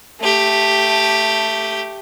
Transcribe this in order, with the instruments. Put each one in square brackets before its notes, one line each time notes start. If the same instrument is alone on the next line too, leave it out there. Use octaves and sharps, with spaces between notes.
[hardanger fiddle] A3 G4